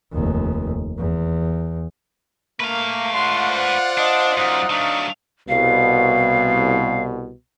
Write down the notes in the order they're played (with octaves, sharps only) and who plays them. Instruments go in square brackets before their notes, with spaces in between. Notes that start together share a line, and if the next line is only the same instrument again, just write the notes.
[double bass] F1 D#2
E2
[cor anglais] A3 [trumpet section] A#3 [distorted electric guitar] B4 F5
[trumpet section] F4 D5 F#5 [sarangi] C6
[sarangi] C5
[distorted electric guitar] D4 [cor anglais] D#5
[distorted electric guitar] F#2 [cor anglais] D#4
[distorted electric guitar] F#3 A3 [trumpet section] D4 F5
[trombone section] C2 B2 [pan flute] F5